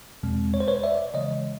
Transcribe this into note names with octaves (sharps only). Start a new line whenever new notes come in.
E2 B2 G#3 C4
C#5
C5
B4 C#5
D5 E5
C#3 E3 G#3 C#5 D#5